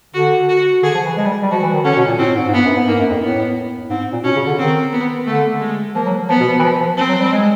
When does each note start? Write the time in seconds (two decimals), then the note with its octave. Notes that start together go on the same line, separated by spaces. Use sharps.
0.14 D3 F#4
0.49 F#4
0.83 D3 G#4
0.94 F3
1.05 E3
1.17 G#3
1.25 G3
1.42 G3
1.51 F3 F#4
1.62 E3
1.74 D#3
1.85 D3 C#4
1.96 B2
2.08 A#2
2.19 A2 C4
2.36 G#2
2.47 G#2
2.54 G2 B3
2.65 F#2
2.76 G#2
2.87 G#2 A#3
2.99 F#2
3.10 F2
3.21 A2 B3
3.90 G#2 C4
4.13 A#2
4.24 B2 C#4
4.36 C#3
4.47 D3
4.58 D#3 C4
4.92 B3
5.26 D3 A3
5.60 G#3
5.95 F3 A#3
6.06 F#3
6.29 F3 B3
6.40 B2
6.59 E3
6.63 F3
6.80 F3
6.97 F3 C4
7.09 F#3
7.20 G3
7.31 G#3